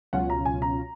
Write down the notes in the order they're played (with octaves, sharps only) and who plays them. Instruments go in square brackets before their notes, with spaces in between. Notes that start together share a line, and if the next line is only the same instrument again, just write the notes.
[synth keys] C#2 B2 F#3 C#4 F4 [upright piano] F#5
[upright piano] A#5
G#5
A#5